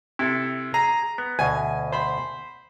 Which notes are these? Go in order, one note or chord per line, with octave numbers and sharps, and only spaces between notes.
C3 E4 A4
G#4 A#5
B3
D2 B2 G#5
C5 B5